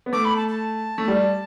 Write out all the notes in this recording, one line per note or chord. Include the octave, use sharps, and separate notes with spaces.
B3
A3 D6
B5
A5
A5
A3
G3